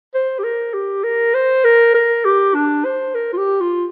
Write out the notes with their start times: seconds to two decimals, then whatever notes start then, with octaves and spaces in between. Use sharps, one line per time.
0.14 C5
0.39 G4
0.44 A#4
0.74 G4
1.04 A#4
1.34 C5
1.65 A#4
1.94 A#4
2.25 G4
2.55 D4
2.85 C5
3.15 A#4
3.33 F4
3.38 G4
3.61 F4